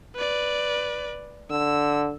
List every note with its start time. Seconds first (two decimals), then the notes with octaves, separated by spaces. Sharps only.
0.15 B4 D5
1.50 D3 E6